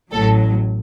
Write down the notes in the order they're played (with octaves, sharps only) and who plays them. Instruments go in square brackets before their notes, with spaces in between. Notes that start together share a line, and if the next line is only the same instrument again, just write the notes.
[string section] A1 A2 F#3 A4